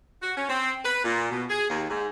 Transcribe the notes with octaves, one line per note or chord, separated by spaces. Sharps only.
F#4
C#4
C4
B4
A#2
B2
G#4
D#2
G#2